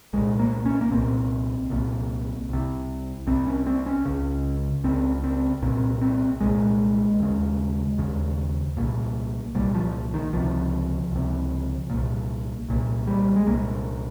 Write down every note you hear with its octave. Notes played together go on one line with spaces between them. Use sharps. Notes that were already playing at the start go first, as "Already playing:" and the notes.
C2 A#2 G#3
A#3
C#4
A#3
C2 A#2 C4
C2 A#2
C2 C3
C2 C3 C4
C#4
C4
C#4
C#2 C#3
C#2 C#3 C4
C4
C2 A#2 C4
C4
C2 A#2 G#3
D#2 C#3
D#2 C#3
C2 A#2
C2 A#2 G3
F3
D#3
C#2 C3 F3
C#2 C3
C2 A#2
C2 A#2
G3
G#3
C2 A#2 A#3